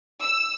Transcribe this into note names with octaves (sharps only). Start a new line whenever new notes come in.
E6